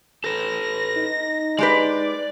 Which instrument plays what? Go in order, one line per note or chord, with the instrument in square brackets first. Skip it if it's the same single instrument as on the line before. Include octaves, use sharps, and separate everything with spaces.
[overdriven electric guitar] A4 B4 [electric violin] A#6
[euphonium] D#4
[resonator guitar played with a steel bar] G#3 G4 B4 [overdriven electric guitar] D5